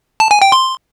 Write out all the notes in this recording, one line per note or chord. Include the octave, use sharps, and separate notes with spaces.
A5
G#5
G5
C6